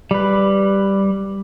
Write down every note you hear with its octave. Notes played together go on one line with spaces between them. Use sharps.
G3 B4